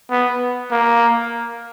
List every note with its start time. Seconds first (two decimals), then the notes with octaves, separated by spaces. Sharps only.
0.11 B3
0.71 A#3